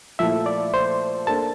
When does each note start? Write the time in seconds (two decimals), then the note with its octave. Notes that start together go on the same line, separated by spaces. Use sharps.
0.19 A#2 F3 A3 E4 A4 E5
0.46 D5
0.74 C5
1.27 A#3 D4 A4 C5 A5